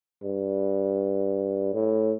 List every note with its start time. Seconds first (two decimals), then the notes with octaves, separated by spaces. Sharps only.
0.22 G2
1.73 A2